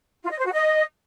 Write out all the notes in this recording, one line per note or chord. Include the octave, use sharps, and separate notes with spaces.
F4
D#5
C5
F#4
D#5